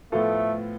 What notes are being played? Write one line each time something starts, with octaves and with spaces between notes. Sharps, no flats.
A2 F3 A3 B3 F4 A4